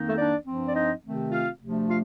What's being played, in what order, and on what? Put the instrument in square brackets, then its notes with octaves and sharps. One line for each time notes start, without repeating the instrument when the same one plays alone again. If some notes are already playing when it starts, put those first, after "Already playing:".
Already playing: [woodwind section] F2 D#3 A#3 D#4
A3 A4
D4 D5
G2 F3 C4
D5
D#4 D#5
C3 D#3 A3 C4
F4 F5
D2 C3 F3 A3 D4
F4 F5